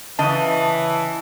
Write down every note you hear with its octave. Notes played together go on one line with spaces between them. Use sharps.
C#3 E3 D#5 A5